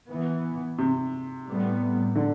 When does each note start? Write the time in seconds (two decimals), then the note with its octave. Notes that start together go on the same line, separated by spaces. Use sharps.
0.09 E3 B3
0.79 C3
1.47 A2 G3 B3
2.15 D3